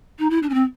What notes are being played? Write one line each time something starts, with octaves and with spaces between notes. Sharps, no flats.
D#4
E4
D4
C#4
C4